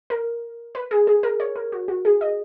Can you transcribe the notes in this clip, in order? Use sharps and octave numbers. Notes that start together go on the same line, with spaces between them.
A#4
B4
G#4
G#4
A#4
C#5
A#4
F#4
F#4
G#4
D#5